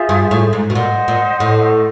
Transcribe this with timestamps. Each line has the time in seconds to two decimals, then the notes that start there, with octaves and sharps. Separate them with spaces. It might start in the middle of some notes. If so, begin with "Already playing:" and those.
Already playing: F4 G#4 C5 E5
0.09 G2
0.31 A2
0.53 G#2
0.70 B2
0.74 A#2 C5 D#5 F#5
1.08 A#2
1.40 A2